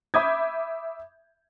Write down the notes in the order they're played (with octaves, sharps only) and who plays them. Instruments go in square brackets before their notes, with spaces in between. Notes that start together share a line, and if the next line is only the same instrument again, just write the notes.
[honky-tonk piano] E5 B5 D6 D#6 G6 G#6